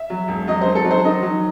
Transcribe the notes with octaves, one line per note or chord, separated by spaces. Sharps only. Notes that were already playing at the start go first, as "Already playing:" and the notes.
Already playing: E5
F#3
E1
F#3 D#5
D#3 C5
A4
F#3
C5
D#3 D#5
F#3